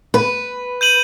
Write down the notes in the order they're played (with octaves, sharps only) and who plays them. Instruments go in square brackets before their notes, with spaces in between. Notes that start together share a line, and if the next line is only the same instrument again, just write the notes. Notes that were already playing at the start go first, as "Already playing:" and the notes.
[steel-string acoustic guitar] B4
[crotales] G6 D#7 F#7